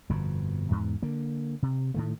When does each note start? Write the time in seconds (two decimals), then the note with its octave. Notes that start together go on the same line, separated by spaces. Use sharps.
0.09 G1 F2 B2
0.71 E2 G#2
1.02 D3 A#3
1.63 C3
1.94 A2 D#3 A3